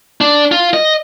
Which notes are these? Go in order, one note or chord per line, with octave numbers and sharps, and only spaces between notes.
D4
F4
D#5